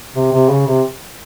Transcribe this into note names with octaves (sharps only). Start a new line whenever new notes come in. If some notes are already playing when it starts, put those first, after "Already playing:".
C3
C3
C#3
C3